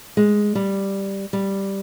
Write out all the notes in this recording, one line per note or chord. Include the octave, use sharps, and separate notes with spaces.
G#3
G3
G3